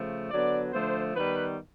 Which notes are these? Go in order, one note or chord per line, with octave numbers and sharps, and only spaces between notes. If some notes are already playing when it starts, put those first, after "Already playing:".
Already playing: C#3 F3 A3
D3 F#3 B3 D5
D3 F3 A3 C5
D#3 G3 B3 B4